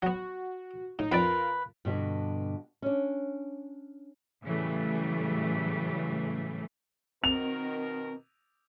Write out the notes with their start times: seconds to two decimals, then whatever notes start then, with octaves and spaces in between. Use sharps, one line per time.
0.02 F#3 B3 F#4
0.99 A2 D#4
1.12 F2 C4 F4 A#4 B4 D5
1.85 G2 B2 D3 F#4
2.82 C#4 D4
4.44 A2 C#3 E3 F#3 G3 A3
7.24 B2 D#3 C4 A#4 F7